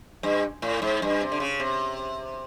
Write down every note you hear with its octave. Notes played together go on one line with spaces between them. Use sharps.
G2
A2
G#2
G2
C3
D3
C#3
C3